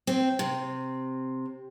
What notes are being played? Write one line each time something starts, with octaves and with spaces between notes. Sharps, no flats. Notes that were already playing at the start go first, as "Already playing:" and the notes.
C4
C3